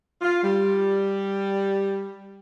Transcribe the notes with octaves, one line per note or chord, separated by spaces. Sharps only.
F4
G3